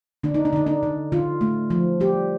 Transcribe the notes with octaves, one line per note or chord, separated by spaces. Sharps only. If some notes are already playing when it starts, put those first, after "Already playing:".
D3 D4
D#4
D4
D3 D#4
D4
D3
D3 F4
A3
F3
G3 G4